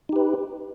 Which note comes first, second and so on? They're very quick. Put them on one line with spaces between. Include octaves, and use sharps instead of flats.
D#4 G4 B4